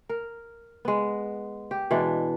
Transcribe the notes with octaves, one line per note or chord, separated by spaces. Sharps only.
A#4
G#3 B3
G4
B2 E3 G#3 D4